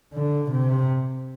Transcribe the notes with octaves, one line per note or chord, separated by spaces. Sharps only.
D3
C3